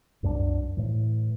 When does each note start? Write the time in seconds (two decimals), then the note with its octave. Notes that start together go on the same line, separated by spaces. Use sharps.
0.23 C2 F#2 F3 D4
0.77 A2 E3